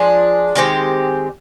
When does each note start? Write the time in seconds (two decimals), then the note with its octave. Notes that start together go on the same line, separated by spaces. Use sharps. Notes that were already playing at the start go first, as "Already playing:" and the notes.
Already playing: F3 G#3 D4 G#4
0.55 D#3 G#3 C4 G4